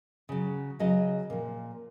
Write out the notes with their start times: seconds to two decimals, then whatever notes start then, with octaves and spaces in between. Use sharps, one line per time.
0.29 C#3 F#3
0.79 C#3 F#3 D#5
1.30 A#2 F3